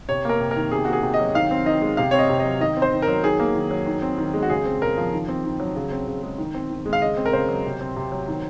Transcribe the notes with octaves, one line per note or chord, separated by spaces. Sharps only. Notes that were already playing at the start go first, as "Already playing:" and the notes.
C3 C#5
A#3 A#4
C3
A#4
D#3
C3 G#4
A#3 F#4
G#4
C3
D#5
F#3
D#3 F5
C4
D#3 D#5
G#3
C3 F5
C4 C#5
D#5
C3
D#5
F#3
D#3 D#5
C4
C5
D#3
A#4
F#3
D#3 G#4
A#3
D#3
F#3
D#3
C4
D#3
G#3
F#4
C#3 G#4
C4
C#3 A#4
F3
D#3
C4
D#3
F#3
C#3
C4
C#3
G#3
D#3
C4
D#3
G#3
F5
C#3 D#5
C4
A#4
C#3 C5
F#3
C3
C4
C3
F#3
D#3